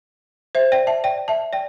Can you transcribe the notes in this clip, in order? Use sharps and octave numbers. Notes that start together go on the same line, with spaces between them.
C5 E5
D5 G5
E5 A5
D5 G5
E5 A5
D5 G5